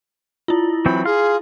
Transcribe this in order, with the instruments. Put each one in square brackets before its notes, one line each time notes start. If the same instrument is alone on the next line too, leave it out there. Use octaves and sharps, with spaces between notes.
[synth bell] E4 F4
[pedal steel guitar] E3 F#3 C4 [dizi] B5
[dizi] G#4 [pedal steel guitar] F5 C6 F6